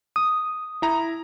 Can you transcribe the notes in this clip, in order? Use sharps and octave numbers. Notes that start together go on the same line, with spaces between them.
D#6
E4 A#5